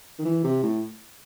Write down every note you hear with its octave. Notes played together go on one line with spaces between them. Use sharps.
D#3
E3
C3
A2